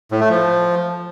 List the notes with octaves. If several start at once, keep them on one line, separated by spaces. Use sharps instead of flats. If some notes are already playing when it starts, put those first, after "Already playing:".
A2
A3
F3